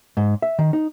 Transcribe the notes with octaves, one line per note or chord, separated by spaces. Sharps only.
G#2
E5
D#3
D#4